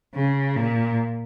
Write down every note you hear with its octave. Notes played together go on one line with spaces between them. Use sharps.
C#3
A#2